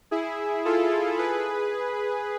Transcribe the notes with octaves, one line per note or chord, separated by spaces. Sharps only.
E4 G#4
F4 A4
G#4 B4